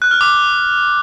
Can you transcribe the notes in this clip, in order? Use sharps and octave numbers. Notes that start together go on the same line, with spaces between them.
F#6
F6
D6